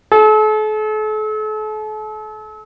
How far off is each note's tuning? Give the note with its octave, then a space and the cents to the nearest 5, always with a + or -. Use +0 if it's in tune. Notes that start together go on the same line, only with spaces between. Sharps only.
A4 -40